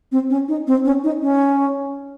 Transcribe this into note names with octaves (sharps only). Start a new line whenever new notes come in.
C4
C#4
D#4
C4
C#4
D#4
C#4